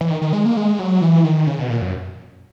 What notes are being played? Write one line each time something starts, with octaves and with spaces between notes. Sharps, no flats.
E3
D#3
D#3
G#3
A#3
G#3
F#3
E3
D#3
C#3
B2
A#2
F#2